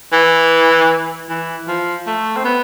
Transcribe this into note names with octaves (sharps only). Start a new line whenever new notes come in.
E3
E3
F3
A3
C4
B3